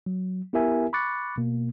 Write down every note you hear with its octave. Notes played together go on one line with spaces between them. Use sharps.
F#3
B3 E4 G4 A#4 E5 G#5
B5 C#6 D6 F#6 A6 C#7
B2 A#3